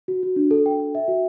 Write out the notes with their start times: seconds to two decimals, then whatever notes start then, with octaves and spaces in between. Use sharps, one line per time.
0.08 F#4
0.23 F#4
0.36 D4
0.51 A4
0.66 G5
0.80 G5
0.95 E5
1.08 F#4